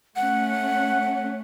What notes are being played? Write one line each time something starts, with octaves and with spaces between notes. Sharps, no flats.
A3 C#4 F#5